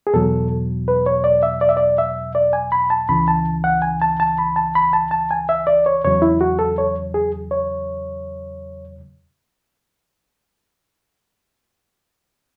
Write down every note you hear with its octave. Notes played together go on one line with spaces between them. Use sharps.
G#4
E2 B2 F#3 A4
B4
C#5
D5
E5
D5
E5
D5
E5
D5
G#5
B5
A5
C#2 C#3 E3 B5
A5
F#5
G#5
A5
A5
B5
A5
B5
A5
A5
G#5
E5
D5
C#5
E2 C#3 F#3 C#5
E4
F#4
A4
C#5
G#4
C#5